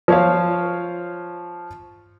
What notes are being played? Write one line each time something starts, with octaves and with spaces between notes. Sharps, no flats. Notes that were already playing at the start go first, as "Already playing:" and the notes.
F3 C#5 F5